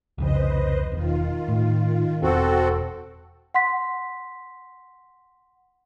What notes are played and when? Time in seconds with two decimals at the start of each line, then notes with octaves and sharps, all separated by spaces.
0.18 C2 F2 C#3 B4 C5 D#5
0.92 E1 D#3 F4
1.48 A2
2.23 E1 C4 F#4 A4
3.54 F#5 C6 B6